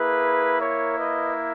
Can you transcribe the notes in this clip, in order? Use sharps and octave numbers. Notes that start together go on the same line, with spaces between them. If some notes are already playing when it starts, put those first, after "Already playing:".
Already playing: A#3 E4 G#4 B4
A#4 C#5
B4 D#5